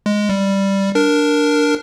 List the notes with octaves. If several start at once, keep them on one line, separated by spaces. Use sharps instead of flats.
G#3
G3
D4 A#4